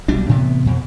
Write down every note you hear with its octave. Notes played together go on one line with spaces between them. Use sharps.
B1 B2 G3 D4
A2 C3 E3 B3
F2 B2